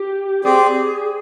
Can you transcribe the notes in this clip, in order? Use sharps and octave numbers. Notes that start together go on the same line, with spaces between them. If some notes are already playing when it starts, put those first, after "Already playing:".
Already playing: G4
C4 G4 G#4 D5